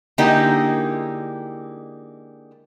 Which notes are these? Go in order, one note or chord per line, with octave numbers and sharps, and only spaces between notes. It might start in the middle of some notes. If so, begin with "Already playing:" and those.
D3 G#3 A#3 D#4 E4 G4